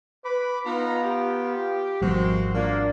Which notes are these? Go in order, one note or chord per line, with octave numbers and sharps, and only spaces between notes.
B4 B5 D6
B3 D#4 F4 A#5
G4
G#1 F3 G3 G#3 A#3 C4 F#4 C5
A#3 D4 F4